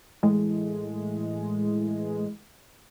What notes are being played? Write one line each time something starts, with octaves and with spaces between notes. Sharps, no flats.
A2 E3 G#3